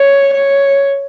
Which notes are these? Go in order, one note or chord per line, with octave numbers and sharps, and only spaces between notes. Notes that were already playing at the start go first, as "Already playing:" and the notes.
Already playing: C#5
C#5